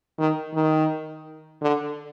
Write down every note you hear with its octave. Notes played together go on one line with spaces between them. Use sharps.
D#3
D#3
D3